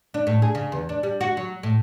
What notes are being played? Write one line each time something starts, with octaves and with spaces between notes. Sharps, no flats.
D4
A2
G#4
C#3
E2
D4
G3
F#4
F#3
A2